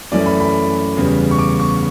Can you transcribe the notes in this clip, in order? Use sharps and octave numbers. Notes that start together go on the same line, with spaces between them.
F#2 E3 A3 C#4 D5
B5
B5
E2 C#3 G3 B3
C#6
D6
C#6